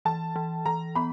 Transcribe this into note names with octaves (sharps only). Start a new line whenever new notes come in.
E3 A5
E3
E3 A#5
B3 B5